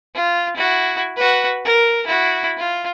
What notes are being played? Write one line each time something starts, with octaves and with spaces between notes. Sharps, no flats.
F4
E4 F#4
F#4 B4
A#4
E4 F#4
F4